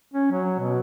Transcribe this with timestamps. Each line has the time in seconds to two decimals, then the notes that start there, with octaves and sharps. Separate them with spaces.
0.14 C#4
0.31 F#3
0.59 B2